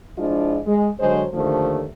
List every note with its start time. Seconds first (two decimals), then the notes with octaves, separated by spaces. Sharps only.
0.18 F3 G#3 D4 E4 F4
0.66 G#3
1.00 D3 F#3 G#3 C5
1.34 D#2 D3 F3 A3